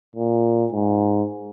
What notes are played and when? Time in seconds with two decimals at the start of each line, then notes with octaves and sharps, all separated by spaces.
0.16 A#2
0.73 G#2